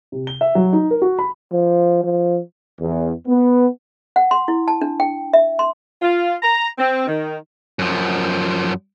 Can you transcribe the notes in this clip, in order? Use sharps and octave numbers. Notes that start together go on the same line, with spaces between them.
C3
G7
E5
F#3
D#4
A#4
F#4
B5
F3
F3
E2
B3
F#5
C6
E4
A5
D4
G5
E5
C6
F4
A#5
C4
D#3
F#2 F3